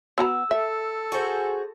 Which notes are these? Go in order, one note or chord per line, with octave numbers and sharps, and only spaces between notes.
B3 F#4 A#5 E6
A4 E5
F#4 G#4 C5